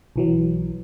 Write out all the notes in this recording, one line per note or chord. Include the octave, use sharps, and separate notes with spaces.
B1 E3 F#3